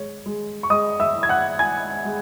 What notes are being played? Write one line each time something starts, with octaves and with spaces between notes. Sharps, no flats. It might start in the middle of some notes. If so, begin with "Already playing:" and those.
Already playing: G#3 C#5
G#3
C#6
G#3 D#5 D#6
E5 E6
E4
G#6
F#5 F#6
E4 G#5 G#6
G#3